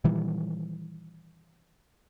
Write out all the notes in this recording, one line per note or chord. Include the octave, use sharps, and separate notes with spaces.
A#2 D#3 E3 G3